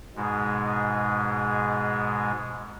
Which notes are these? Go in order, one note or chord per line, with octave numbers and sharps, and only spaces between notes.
G#2 B2 G#3